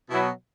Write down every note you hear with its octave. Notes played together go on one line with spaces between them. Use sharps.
B2 F#3 E4